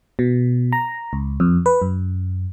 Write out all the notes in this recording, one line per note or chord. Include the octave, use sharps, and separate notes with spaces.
B2
A#5
C#2
F2
B4
F#2